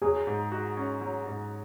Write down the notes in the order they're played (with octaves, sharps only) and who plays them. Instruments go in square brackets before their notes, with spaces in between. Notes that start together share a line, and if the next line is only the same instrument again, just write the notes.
[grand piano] F#3 [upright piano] G#4
[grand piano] G#2
F#4
C#4
F#3
G#2